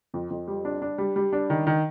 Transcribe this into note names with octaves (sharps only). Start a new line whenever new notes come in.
F2
F2
G3
D4
D4
G3
G3
D4
D#3
D#3